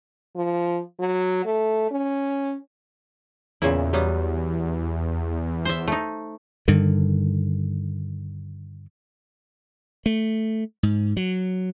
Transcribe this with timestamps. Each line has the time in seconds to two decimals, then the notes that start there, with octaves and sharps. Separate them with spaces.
0.36 F3
1.00 F#3
1.45 A3
1.91 C#4
3.62 E2 A#2 C#3 E4
3.93 F#3 G3 B3
5.65 C5 E5
5.88 A3 D#4
6.68 G2 D3 D#3
10.06 A3
10.83 G#2
11.17 F#3